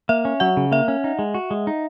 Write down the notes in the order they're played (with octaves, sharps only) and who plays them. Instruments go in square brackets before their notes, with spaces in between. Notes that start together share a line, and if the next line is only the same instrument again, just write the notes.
[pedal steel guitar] A#3 [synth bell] E5
[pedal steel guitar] C#4
[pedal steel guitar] F#3 [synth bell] F#5
[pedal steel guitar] C#3
[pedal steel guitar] A#3 [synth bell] E5
[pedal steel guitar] C#4
D#4
G#3
F#4
G#3
D#4